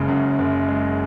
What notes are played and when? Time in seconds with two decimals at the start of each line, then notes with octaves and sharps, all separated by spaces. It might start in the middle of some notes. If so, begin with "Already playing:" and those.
Already playing: F#1 C#3 G#3
0.08 F#2
0.39 F#1
0.69 G#3